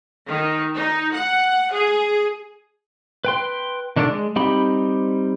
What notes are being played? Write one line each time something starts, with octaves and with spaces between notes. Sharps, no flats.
D#3
D#4
F#5
G#4
B4 G5 C6
D#3 D4 A4 C#5 D5
G#3
G3 C4 D#4 G4 B5